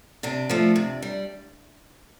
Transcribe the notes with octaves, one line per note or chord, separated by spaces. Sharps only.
C3 D4
F3 A3
C3
G3